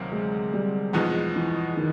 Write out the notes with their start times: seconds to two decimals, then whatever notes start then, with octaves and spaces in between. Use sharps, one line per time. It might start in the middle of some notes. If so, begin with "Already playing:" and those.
Already playing: D2 C3 D#3 F#3 A#3
0.12 G#3
0.53 G3
0.93 E2 B2 F3 G#3 B3 D#4
1.36 E3
1.77 D#3